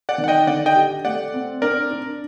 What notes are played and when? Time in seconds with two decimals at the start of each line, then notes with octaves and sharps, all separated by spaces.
0.09 D5 F#5
0.18 D#3
0.24 F#5
0.28 D#5 G5
0.47 D3 D5 F#5
0.66 D#5 G5
0.75 G4
1.05 A3 D5 F#5
1.34 C4
1.62 D4 A#4 D5
1.90 D4